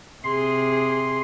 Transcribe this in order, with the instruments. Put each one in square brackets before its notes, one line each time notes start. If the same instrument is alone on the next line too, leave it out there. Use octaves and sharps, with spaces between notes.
[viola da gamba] C3 G#4 [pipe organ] C6